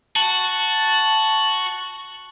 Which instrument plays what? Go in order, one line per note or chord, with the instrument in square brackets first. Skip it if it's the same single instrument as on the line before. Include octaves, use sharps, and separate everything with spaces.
[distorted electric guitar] F#4 [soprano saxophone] A5